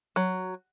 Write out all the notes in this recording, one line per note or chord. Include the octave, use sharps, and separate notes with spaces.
F#3